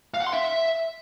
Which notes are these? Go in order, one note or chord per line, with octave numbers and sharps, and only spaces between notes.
F5
F#5
C6
E5